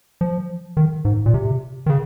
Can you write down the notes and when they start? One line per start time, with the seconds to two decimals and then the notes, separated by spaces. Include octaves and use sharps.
0.21 F3
0.77 D#3
1.05 G#2
1.26 A#2
1.34 C3
1.86 D#3
1.90 C#3